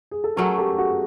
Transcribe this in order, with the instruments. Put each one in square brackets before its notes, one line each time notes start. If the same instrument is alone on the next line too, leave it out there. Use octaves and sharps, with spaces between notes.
[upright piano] G#4
A4
[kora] F#3 A3 C#4 [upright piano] G#4 A#4
[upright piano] G4 A4
F#4 G#4